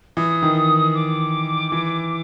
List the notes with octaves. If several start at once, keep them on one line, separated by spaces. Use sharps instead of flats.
E3 D#6
D#3
D6
E3